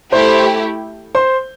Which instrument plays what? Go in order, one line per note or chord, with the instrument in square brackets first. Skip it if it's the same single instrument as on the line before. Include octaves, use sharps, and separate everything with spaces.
[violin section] A3 E4 G4 [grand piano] C5 C6
[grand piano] C5 C6